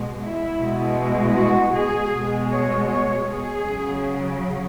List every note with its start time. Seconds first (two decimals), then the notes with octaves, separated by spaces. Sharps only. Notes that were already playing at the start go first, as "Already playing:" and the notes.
Already playing: B2 G#3
0.21 E4
0.59 B2 G#3
0.97 E4
1.36 F#4
1.74 G#4
2.12 B2 G#3
2.50 C#5
2.88 C#5
3.26 G#4
3.64 C#3 F#3